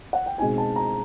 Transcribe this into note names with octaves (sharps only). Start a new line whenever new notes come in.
F#5
G5
B2 G#3 C4 D#4 G#5
A5
A#5